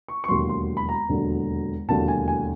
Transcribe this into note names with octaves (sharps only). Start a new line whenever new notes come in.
C#6
C#6
E1 D#2 D3 F#3 C6
C6
B5
A#5
E1 D#2 D3 F#3
E1 D#2 D3 F#3 A5
G#5
G#5